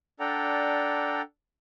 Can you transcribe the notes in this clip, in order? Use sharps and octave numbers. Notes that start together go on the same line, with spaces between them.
D4 A4 D5 F#5 G5 A#5